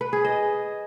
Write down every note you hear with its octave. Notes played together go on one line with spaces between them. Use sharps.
B4
G#4
D#5